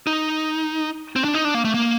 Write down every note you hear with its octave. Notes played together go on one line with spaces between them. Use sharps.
D#4
C4
D4
D#4
D4
A#3
A3
A#3